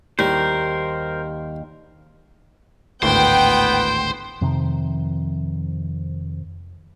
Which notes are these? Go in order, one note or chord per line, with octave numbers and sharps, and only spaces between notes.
D#2 G3 A#4 C5
G#1 D2 A2 B3 C5 G5
F2 C3 D#3 F3